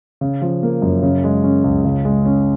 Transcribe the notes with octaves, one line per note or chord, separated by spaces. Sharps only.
C#3
F3
A#3
F#2
C#3
G#3
C#4
C#2
C#3
G#3
C#4